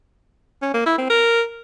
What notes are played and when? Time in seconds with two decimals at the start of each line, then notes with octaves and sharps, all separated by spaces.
0.62 C#4
0.74 A#3
0.86 E4
0.98 C4
1.10 A#4